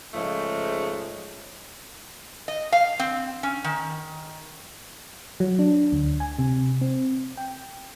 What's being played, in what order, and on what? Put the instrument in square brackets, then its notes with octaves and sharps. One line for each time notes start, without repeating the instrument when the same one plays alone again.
[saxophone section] G#2 C#3 F3 G#3 A3
[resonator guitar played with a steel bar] D#5
F5
C4
C#4
D#3
[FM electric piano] F#3
D4
D2
G#5
C3
C4
G5